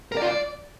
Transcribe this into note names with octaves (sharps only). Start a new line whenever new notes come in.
A#4
D5
F4
D5